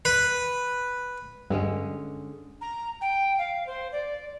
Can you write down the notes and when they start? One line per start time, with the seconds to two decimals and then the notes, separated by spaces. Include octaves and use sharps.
0.05 B4
1.50 G2 D3 G#3 C#4
2.61 A#5
3.01 G5
3.38 F5
3.67 C5
3.92 D5